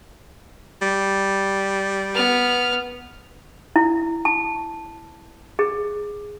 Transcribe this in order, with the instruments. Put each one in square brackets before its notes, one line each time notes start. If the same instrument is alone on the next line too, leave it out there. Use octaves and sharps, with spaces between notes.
[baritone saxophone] G3
[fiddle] B3 F6
[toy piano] E4
A5
G#4